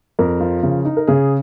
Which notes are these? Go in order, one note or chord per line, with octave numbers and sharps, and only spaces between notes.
F2 A#4
F3
C#3
D#4
A#4
C#3 G#4